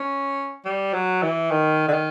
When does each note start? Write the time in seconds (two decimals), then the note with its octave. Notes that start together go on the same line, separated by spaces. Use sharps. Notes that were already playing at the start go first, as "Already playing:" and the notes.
Already playing: C#4
0.65 G3
0.94 F#3
1.23 E3
1.51 D#3
1.88 D3
1.93 D#3